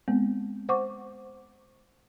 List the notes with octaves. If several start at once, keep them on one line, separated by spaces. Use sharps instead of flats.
G#3 B3 C4
C5 F#5 C#6 D6